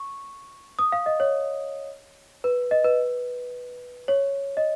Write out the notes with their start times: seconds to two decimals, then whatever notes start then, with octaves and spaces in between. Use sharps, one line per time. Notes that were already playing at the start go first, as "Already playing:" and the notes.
Already playing: C#6
0.79 D#6
0.92 F5
1.06 D#5
1.20 C#5
2.44 B4
2.71 D#5
2.85 B4
4.08 C#5
4.57 D#5